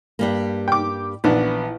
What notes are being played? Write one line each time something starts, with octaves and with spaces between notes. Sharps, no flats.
G2 G3 A#3
G5 D6
A#1 E3 B3 D4